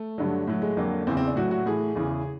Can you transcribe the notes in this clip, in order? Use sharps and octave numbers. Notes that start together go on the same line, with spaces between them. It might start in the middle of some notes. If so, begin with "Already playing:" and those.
Already playing: A3
G2 D3 F#3
A2 F#3
G#3
F2 D3 F#3 A#3
E2 C#3 E3 C4
C4
D4
A2 F#3 F#4
F#4
A2 E3 G#4
E2 C#3 E3